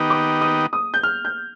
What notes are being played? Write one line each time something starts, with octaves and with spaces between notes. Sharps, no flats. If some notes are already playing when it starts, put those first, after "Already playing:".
Already playing: D#3 B3 D#4 G4
D6
D#6
D#6
G6
F6
G6